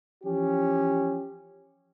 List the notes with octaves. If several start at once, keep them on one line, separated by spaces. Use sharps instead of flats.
E3 F3 C#4 G4